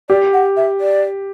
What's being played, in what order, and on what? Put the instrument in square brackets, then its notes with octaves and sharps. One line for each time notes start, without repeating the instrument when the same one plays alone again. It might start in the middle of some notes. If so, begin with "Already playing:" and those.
[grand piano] G4 [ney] D5
[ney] F#5
E5
D5